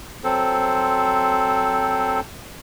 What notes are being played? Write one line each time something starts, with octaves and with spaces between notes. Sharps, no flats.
F#3 C4 A4 C5